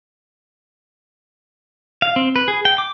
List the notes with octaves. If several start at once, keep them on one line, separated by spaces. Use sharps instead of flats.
F5
C4
B4
G#4
G5
D6